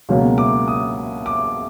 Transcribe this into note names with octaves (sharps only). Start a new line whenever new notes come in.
C#2 B2 F#3 A#3 C#4
D6
D#6
D6